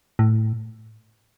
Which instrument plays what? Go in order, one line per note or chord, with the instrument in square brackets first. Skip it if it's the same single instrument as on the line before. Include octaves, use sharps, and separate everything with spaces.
[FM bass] A2